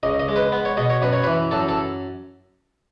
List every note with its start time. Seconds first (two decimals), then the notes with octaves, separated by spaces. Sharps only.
0.03 C#2 D#5
0.20 D#5
0.28 G#3
0.36 B4
0.52 B3
0.65 C#5
0.77 B2 D#5
0.90 C#5
1.02 F#2 B4
1.13 C#5
1.24 E3 B4
1.51 F#2 A4
1.69 A4